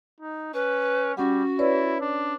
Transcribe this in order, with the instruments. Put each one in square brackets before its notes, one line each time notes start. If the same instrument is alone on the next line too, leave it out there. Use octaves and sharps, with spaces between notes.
[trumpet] D#4
[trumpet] C#4 [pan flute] B4
[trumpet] G3 [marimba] C#4 F#5 [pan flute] F#4
[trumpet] E4 [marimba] B4 C#5 D5
[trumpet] D4